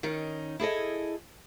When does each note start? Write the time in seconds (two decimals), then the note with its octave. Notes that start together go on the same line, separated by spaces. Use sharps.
0.03 D#3 C#4 D#4
0.59 E4 G#4 A4 D#5